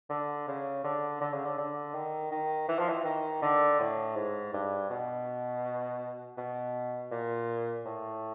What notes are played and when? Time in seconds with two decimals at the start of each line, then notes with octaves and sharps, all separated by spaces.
0.10 D3
0.47 C#3
0.84 D3
1.21 D3
1.33 C#3
1.45 D3
1.58 D3
1.94 D#3
2.31 D#3
2.68 E3
2.79 F3
2.89 E3
3.05 D#3
3.42 D3
3.80 A2
4.16 G#2
4.53 G2
4.90 B2
6.38 B2
7.11 A#2
7.85 A2